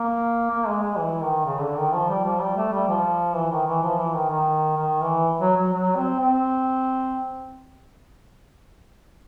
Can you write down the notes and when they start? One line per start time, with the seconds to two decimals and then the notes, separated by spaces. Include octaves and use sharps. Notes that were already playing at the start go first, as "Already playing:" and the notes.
Already playing: A#3
0.51 A#3
0.67 G#3
0.83 G#3
0.98 E3
1.22 D#3
1.45 C#3
1.62 D3
1.77 D#3
1.93 F3
2.09 G3
2.25 F3
2.40 G3
2.57 A3
2.72 G3
2.88 F3
3.35 E3
3.51 D#3
3.67 E3
3.83 F3
3.99 E3
4.14 D#3
4.30 D#3
4.77 D#3
5.02 E3
5.41 F#3
5.57 F#3
5.73 F#3
5.96 C4
6.20 C4